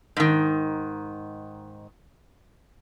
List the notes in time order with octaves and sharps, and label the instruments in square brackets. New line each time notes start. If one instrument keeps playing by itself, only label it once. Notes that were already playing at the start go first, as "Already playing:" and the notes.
[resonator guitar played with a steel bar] G#2 D#3